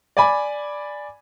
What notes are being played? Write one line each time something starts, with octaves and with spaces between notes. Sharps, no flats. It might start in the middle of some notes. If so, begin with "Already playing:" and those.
D5 G#5 B5